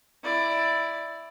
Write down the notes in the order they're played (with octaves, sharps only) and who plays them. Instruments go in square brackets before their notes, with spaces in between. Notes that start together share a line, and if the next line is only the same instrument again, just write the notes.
[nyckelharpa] E4 D5